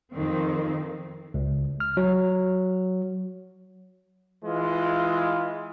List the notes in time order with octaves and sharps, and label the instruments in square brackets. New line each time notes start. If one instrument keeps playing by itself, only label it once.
[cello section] F2 D#3 C4
[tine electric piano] C#2
F6
F#3
[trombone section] E3 G#3 F4